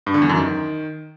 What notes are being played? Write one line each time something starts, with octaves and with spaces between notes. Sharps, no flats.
G2
D3
E2
F#2
D#3